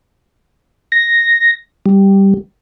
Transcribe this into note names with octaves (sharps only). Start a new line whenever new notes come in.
A#6
G3